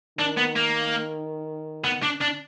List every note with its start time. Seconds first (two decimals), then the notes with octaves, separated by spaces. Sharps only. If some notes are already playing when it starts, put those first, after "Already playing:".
0.18 D#3 D4
0.37 B3
0.56 A#3
1.84 B3
2.03 D4
2.21 D4